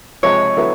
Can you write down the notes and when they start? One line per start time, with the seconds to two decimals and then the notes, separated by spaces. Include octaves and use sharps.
0.23 C#2 C3 F3 G#3 C#5
0.57 D3 F#3 B3 E4